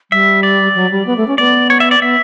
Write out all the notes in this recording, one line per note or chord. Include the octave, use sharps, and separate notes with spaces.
G3 E5
D5
F#3
G3
B3
A3
C#4
B3 D5
C#5
E5
D5
B3 E5